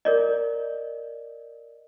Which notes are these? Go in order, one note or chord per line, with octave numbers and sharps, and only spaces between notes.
A#4 D5 D#5